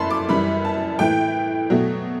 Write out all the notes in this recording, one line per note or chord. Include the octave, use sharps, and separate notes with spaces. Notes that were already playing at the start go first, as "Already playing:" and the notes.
Already playing: F#2 E3 A3 A5 B5 C6
D6
F#2 E3 G3 B5
A5
A2 E3 A3 G5
B2 F#3 A3